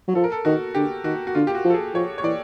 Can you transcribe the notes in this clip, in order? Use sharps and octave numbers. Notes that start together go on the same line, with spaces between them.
F#3
F3 A4
A#4
A4
D#3 F#4
D3 G4
D#3 F#4
F#4
D3 F4
G4
F#4
F3
A4
G#4
F3 C#5
C#5
E3 D5